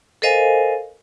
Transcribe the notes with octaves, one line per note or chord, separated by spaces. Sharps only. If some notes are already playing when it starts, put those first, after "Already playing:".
A4 A#4 C5 D#5 F5 G#5